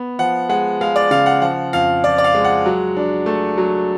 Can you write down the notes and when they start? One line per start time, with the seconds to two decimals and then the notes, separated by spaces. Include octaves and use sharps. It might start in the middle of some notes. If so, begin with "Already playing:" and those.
Already playing: B3
0.19 F3 F#5
0.49 G#3 F#5
0.81 G#3 F5
0.96 D5
1.11 C#3 F5
1.26 F#5
1.42 F3 F#5
1.73 F2 F5
2.04 F3 D5
2.18 D5
2.24 F5
2.35 G#3
2.44 F#5
2.66 F#3
2.97 D4
3.26 A3
3.58 F#3